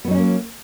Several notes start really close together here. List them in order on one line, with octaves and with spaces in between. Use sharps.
B3 F#3 D#4 C#4 A#3